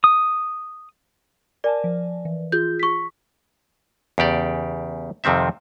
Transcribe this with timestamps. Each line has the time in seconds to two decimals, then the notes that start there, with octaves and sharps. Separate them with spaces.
0.04 D#6
1.64 A#4 D5 G#5 A5
1.84 F3
2.25 E3
2.52 F4 G#4 G6
2.79 C#6 B6
4.18 E2 C#3 G4 D5
5.24 F2 C3 D#3 C4 E5